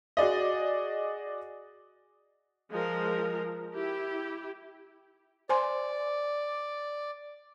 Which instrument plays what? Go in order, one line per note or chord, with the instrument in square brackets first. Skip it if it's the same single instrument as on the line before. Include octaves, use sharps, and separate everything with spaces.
[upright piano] F#4 G#4 D5 D#5
[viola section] F3 G#3 A#4
E4 G4
[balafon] C5 G#5 C6 [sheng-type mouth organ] D5